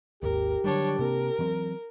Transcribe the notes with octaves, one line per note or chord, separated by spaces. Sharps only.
G#1 D#2 G4 A#4
D3 F#3 G3 D4 C#5
C3 A#3 C4 A#4
E3 F#3 C4